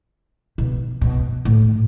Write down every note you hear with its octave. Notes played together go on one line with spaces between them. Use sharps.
B2
B2
A2